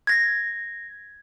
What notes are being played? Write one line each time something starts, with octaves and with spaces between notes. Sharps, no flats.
G#6 A#6